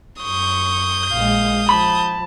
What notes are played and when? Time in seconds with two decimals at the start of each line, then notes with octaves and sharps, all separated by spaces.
0.21 F#2 C#6 D#6 G6
1.13 A#1 G#3 F5
1.69 F3 A5 B5